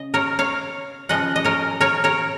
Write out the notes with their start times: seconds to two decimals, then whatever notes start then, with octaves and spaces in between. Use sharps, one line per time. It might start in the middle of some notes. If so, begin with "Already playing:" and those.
Already playing: C#3 D#5
0.14 A#4 C#5
0.39 C#5 F5
1.09 C#3 F3 G#3 D#5 F#5
1.36 D#5
1.44 A#4 C#5
1.80 A#4 C#5
2.04 A#4 C#5